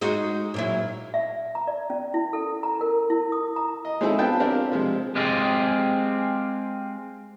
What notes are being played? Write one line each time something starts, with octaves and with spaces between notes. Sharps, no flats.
G#3 D#4 F#4
A#2 F#3 E4
E5
A#5
D5
C#4
E4
A4
A#5
A#4
E4
D#6
A#5
D#5
G#3 C4 D#4 E4 G#4 A4
B3 D4 F4 G5 A5
C4 D4 F4 G4 A#4
C3 F3 G#3
G#3 C4 F4 G4 G#4